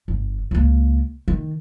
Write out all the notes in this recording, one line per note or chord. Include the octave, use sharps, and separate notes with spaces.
G1
C#2 A#3
D#3